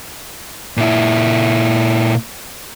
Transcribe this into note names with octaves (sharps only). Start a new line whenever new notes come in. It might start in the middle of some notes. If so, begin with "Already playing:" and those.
A#2 E4